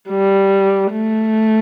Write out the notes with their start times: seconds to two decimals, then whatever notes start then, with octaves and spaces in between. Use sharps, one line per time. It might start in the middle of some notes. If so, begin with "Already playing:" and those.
0.09 G3
0.92 A3